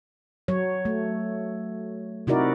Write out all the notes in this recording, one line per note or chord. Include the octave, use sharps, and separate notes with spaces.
F#3 C#5
A3
C3 D#4 E4 F#4 A#4 D5